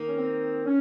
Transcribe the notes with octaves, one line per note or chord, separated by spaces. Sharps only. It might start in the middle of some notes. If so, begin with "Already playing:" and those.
Already playing: D#3 A#3 D#4
C#4
C4
C#4